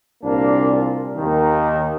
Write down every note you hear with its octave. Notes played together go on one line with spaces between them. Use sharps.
C2 A#2 A#3 D4
D#2 D#3